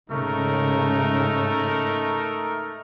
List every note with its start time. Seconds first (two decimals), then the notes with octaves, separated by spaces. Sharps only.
0.10 G#2 C#3 A3 D#4 A#4